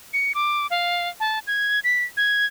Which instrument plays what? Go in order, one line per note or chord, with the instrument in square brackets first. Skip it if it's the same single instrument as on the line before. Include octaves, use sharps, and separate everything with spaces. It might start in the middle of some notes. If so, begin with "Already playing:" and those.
[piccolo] C#7
D6
F5
A5
G#6
B6
G#6